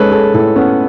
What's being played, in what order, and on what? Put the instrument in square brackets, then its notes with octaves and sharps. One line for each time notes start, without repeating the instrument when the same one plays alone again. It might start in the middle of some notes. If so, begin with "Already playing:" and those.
Already playing: [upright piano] G#3 C#4 [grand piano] A4 B4 C#5
[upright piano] G#4 [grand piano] A4
[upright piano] A2 [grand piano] A4
[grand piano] B3 [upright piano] C#4